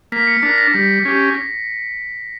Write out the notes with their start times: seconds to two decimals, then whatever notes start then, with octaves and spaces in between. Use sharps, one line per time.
0.12 A#3 B6
0.27 C#7
0.43 D4 A#4 B6
0.58 A#6
0.74 G3 B6
1.05 C#4 G4